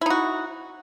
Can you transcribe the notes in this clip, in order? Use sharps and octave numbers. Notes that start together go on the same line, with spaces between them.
D#4 E4 F#4